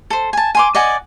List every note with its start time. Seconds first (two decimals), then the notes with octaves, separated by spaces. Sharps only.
0.10 A4 C5
0.33 G#5 A5
0.55 G#5 C6 D6
0.75 D5 D#5 F#5 G#5